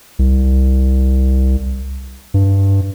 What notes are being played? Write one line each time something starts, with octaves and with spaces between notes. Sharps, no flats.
C2
G2